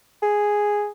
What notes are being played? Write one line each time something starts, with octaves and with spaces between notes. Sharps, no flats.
G#4